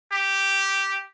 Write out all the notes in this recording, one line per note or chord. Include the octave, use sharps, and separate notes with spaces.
G4